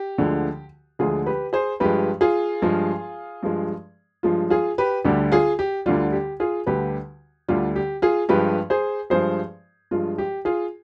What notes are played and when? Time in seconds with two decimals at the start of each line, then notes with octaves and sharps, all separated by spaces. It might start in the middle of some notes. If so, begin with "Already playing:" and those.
Already playing: G4
0.18 D2 D3 F3 G#3
0.99 D2 D3 F3 G#3 F4 G#4
1.26 G4 B4
1.53 G#4 C5
1.80 G2 F3 G#3 G4 B4
2.21 F4 G#4
2.62 G2 F3 G#3
3.43 G2 F3 G#3
4.23 G2 F3 G#3 F4
4.50 F4 G#4
4.78 G4 B4
5.05 D2 D3 G3 G4
5.32 F4 G#4
5.59 G4
5.86 D2 D3 G3 F4
6.12 G4
6.40 F4 G#4
6.66 D2 D3 G3 G4 B4
7.48 D2 D3 G3 F4
7.76 G4
8.02 F4 G#4
8.29 G2 F3 G#3 G4 B4
8.70 G#4 C5
9.10 G2 F3 G#3 G#4 C5
9.91 G2 F3 G#3 F4
10.18 G4
10.45 F4 G#4